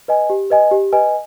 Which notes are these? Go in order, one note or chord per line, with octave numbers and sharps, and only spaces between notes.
B4 D#5 G#5
G4
B4 D#5 G#5
G4
B4 D#5 G#5